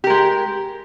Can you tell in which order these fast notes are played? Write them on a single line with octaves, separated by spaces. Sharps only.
G4 A#4 G#3